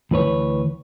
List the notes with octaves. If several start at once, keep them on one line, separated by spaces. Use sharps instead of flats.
D2 E3 B4 C#5